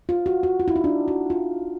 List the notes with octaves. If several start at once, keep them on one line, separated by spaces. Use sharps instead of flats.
F4
F#4
F#4
F4
E4
D#4
D4
F#4
F4